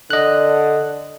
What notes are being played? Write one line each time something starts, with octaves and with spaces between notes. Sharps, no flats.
D3 D#5 F#6